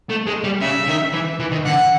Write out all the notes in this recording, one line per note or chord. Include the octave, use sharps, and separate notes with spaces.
A3
G#3
G3
C#3 E5
D#3
E3
E3
D#3
D3 F#5